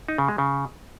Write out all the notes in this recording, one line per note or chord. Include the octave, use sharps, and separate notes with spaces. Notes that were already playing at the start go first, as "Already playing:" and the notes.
D#4
C#3
G#3
C#3